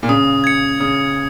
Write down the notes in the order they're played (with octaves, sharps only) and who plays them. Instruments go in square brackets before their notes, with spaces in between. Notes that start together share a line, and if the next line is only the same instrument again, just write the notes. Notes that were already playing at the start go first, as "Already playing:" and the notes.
[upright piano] A#2
[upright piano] C#3 [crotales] D#6
[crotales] G#6 C#7
[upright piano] C#3 [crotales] D#6